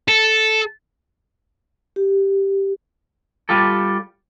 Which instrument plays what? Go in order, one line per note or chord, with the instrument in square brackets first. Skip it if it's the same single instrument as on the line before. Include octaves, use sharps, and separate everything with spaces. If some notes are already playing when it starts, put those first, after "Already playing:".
[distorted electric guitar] A4
[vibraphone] G4
[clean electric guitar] G3 F4 G4 A4